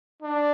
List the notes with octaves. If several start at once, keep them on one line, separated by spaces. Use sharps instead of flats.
D4